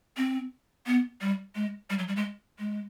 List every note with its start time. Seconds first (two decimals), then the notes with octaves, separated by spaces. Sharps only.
0.17 C4
0.86 B3
1.21 G3
1.55 G#3
1.90 G3
1.99 F#3
2.08 G3
2.16 G#3
2.59 G#3